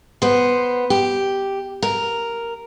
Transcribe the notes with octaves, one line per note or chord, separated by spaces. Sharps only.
B3 C5
G4
A#4